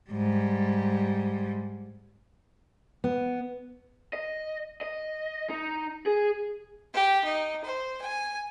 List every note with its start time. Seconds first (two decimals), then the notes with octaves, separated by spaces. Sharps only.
0.10 G#2 G3
3.04 B3
4.13 D#5
4.81 D#5
5.49 D#4
6.06 G#4
6.94 G4
7.24 D#4
7.64 C5
8.01 G#5